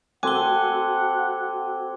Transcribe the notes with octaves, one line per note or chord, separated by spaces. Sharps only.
C4 F#4 A4 F#5 G#5 D6 G7